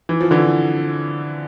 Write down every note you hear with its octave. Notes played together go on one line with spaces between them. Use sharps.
E3
F3
D3 E3